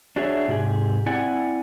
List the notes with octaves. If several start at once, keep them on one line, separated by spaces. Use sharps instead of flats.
D4 F#4 G#4 C#5 D#5 E5
G#2 C3 G4 G#4
C4 E4 D5 F#5 G#5